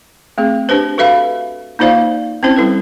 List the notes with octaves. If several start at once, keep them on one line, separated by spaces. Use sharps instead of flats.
A3 C4 G#4
D4 G4 B4 C5
F#4 A4 B4 E5 F5 B5
A#3 D#4 F4 C5 D5 F5
C4 C#4 E4 C5
G3 E4 A4 B4